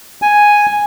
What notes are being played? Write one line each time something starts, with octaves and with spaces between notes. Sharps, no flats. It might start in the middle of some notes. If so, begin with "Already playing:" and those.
G#5